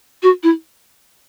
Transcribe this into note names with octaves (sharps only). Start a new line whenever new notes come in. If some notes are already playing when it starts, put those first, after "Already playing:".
F#4
E4